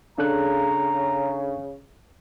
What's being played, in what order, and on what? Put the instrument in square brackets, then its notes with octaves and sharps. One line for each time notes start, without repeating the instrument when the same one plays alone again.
[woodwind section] C#3 [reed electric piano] D4 A4 F#6 [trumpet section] A#5